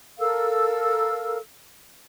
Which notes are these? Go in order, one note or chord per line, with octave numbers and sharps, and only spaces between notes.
A4 A#4 F5 E6